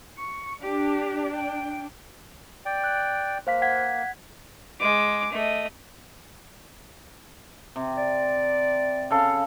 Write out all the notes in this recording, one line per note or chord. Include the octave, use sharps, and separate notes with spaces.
C#6
D4 G4
G5
D5 G5
F#6
A#3 C5 F5 B6
F#5 G#6 B6
G#3 D6
A3 D#5
C3
D5
C#3 A4 F5